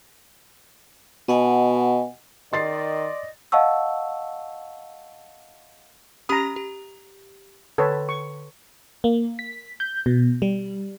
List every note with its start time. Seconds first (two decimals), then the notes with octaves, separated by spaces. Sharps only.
1.28 B2 D#5 F#5 G#5
2.53 D#3 D5 D#5 C6 A6 C7
3.52 D#5 F5 F#5 A5 C#6 E6
6.29 C#4 G4 A#5 B5 D#6
6.56 G4
7.78 D3 A4 B4 C#5
8.09 C#6
9.04 A#3
9.39 B6
9.80 G6
10.06 B2
10.42 G3